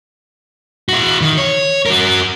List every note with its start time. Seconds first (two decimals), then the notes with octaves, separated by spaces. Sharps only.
0.89 E4 F#4
1.21 D#3
1.38 C#5
1.86 F#4 A#4